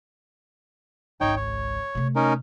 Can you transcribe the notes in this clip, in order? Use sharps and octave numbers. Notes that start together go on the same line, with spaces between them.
G#1 C#2 D#4 C#5 G5
C#5
C3 A3
C#4 D#4 A#4